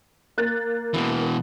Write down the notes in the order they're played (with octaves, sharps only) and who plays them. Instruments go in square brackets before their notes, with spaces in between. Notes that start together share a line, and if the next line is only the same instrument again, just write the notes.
[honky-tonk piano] A#3 F#6 A6
[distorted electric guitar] B2 E3